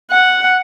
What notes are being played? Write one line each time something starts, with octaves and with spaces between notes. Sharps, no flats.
F#5